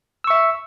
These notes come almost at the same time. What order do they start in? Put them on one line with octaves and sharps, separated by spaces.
E6 C#6 E5